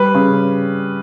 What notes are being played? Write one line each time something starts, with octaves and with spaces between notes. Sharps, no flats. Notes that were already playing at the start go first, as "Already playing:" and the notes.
Already playing: G3 B4
C#3